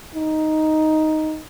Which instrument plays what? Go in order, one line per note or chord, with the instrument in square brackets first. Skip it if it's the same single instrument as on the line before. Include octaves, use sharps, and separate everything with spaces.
[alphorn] D#4